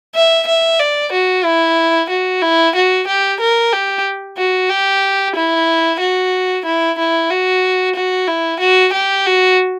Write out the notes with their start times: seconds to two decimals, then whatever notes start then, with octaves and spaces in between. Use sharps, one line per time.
0.15 E5
0.47 E5
0.79 D5
1.12 F#4
1.45 E4
2.10 F#4
2.42 E4
2.75 F#4
3.07 G4
3.40 A#4
3.73 G4
4.38 F#4
4.70 G4
5.36 E4
6.01 F#4
6.65 E4
6.98 E4
7.30 F#4
7.95 F#4
8.28 E4
8.60 F#4
8.93 G4
9.26 F#4